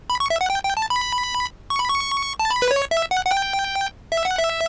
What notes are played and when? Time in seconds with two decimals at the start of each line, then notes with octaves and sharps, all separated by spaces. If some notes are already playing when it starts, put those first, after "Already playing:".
0.10 B5
0.20 C#6
0.30 E5
0.41 F#5
0.50 G5
0.64 G5
0.77 A5
0.90 B5
1.70 C#6
1.79 B5
1.89 C#6
2.40 A5
2.51 B5
2.62 B4
2.71 C#5
2.91 E5
3.11 F#5
3.25 F#5
3.31 G5
4.12 E5
4.25 F#5
4.38 E5